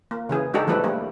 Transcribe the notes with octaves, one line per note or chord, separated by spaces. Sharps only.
A#3
C#3 E3 G#4
G#3 D4 D#4 F#4 G4 A4
E3 F3 G3 A3 A4 B4
G3 A#3